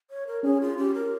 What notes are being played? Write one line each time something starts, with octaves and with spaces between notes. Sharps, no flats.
C#5
A#4
C#4 G#4
F4
G4
A#4